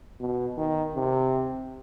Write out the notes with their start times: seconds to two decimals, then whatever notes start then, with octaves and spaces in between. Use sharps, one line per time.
0.20 B2
0.57 D#3
0.95 C3